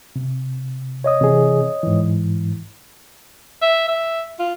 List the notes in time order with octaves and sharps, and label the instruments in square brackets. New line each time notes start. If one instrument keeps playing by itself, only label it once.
[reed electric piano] C3
[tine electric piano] C#5 D#5 D#6
[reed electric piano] C3 E3 G#4
G#2 E3
[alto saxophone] E5
E5
F4